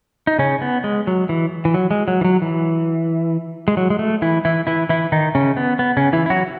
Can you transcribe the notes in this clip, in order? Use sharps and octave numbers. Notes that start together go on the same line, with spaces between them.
D#4
C#3 C#4
B3
G#3
F#3
E3
E3
F#3
G#3
F#3
E3
F#3
E3
G#3
F#3
G#3
A3
E3 E4
E3 E4
E3 E4
E3 E4
D#3 D#4
C#3 C#4
B3
B3
C#3 C#4
E3 E4
E4
F#3 F#4